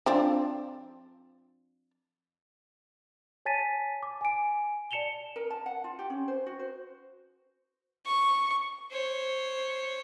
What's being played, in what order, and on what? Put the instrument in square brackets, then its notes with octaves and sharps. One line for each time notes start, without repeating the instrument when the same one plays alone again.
[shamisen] F3 C4 D4
[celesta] C#5 G#5 A5 A6 B6 D#7
D6
G#5 D7
D5 A5 C#7 E7 F7 G7
[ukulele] A#4
A5
F#5
F4
G4
C#4
C5
F#4
C5
[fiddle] C#6
C5 C#5